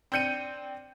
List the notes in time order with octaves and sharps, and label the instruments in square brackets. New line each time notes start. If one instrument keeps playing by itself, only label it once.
[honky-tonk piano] C4 D4 G6 C#7 D#7